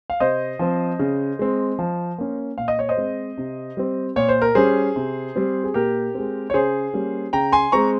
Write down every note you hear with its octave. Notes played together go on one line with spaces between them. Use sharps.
F5
C3 C5 D#5
F3 C4
C#3
G#3 C4
F3
A#3 C#4
A#2 F5
D#5
C#5
C5 D#5
G#3 C4
C3
G3 C4
A#2 C#5
C5
A#4
G3 C#4 G#4 C5
C3
G3 C4
G#4
A#2 G4 A#4
G#3 C4
C#5
C#3 G#4 C5
G3 A#3 C#4
C#3 G5 A#5
G#5 C6
G#3 C4 A#5 C#6